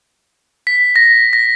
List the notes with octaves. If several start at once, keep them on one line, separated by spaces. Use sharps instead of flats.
B6
A#6
A#6